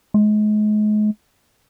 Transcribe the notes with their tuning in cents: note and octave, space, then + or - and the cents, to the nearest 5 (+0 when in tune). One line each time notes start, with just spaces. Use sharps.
G#3 +35